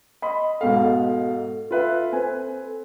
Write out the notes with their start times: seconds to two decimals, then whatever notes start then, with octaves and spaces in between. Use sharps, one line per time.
0.22 D#5 B5 C6
0.61 G#2 B2 A4 F5
1.71 F4 B4 E5
2.12 C4 B4 G#5